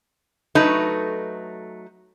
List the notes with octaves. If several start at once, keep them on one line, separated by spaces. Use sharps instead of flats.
F#3 A3 D#4 B4